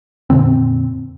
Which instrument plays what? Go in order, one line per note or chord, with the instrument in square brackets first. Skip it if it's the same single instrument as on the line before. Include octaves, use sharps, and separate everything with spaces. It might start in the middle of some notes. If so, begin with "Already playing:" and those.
[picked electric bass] F2 A#2 D3 C4